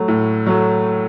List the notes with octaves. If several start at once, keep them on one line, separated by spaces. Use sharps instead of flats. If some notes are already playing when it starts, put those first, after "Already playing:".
Already playing: F#3 A3
A2
F#3 A3